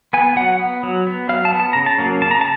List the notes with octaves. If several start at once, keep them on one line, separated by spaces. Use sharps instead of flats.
B3 G#5
F#3 F#5
B3
F#3
B3
F#3 F5
A5
B3
A5
C#3 A#5
A5
F#3 A#3 C#4
C#3 A5
A#5
A5